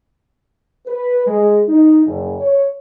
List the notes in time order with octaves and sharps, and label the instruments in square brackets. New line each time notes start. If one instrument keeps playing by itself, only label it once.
[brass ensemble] B4
G#3
D#4
F#1
C#5